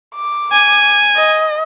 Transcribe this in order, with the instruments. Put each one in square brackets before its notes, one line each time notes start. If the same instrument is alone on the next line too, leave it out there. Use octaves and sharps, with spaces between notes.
[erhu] D6
[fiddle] G#5
[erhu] D#5